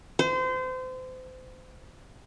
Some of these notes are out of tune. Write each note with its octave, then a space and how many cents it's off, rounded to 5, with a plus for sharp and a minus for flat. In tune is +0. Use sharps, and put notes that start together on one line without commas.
C5 -30